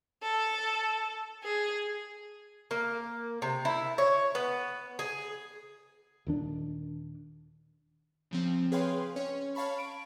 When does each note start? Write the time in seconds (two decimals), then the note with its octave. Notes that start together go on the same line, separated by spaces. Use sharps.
0.23 A4
1.44 G#4
2.71 A#3
3.42 C3
3.65 E4
3.98 C#5
4.35 B3
4.99 G#4
6.27 D#1 D#3 D4
8.31 C#3 F3 C4
8.72 G#4 B4 C#5 F5 G5 C6
9.16 C#4 C#5
9.55 C#5 F5 A5 B5 C#6
9.79 D7